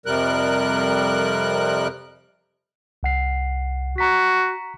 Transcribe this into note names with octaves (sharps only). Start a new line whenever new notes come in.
F2 C3 G3 A#4 F#6
C2 F#5 C7
F#4 A#5 B6